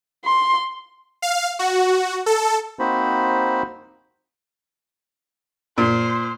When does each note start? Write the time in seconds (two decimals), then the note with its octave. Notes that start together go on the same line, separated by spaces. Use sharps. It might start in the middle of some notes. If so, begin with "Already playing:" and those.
0.25 C6
1.22 F5
1.59 F#4
2.26 A4
2.79 A#3 C4 D#4 F#4 C5 B5
5.78 A#2 C5